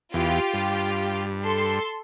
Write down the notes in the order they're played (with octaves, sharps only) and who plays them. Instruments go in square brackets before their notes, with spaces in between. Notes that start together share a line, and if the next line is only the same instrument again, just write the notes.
[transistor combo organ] E2 [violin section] F4 G4
[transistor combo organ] G2
[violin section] A4 C6